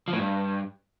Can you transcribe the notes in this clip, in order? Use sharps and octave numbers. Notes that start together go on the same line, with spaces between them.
F3
A2
G2